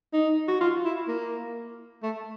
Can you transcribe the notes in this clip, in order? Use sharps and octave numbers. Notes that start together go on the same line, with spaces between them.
D#4
F#4
F4
E4
A#3
A3